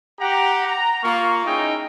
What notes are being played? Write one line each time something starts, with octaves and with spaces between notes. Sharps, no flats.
G4 F#5 A#5
A#5
A#3 F4 C#6
C#4 D#4 E4 G#4 D#5 G5